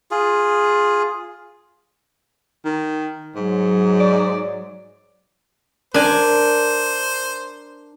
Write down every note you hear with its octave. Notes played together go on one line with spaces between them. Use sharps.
F4 G#4
D#3
G#2 F#3
D5
D4 A#4 C5 G#5